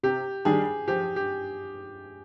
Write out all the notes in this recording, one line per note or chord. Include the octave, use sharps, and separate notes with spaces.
C3 G4
D#3 G3 D4 G#4
F3 G4
G4